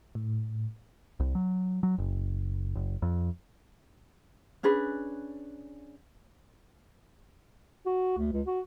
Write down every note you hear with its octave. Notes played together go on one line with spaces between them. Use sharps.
A2
C2
F#3
F#3
F#1
F#1
F2
C#4 D4 G#4 B4
F#4
D2
C#2
F#4